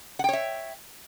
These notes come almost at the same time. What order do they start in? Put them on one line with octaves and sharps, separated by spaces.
F#5 G5 C#5 E5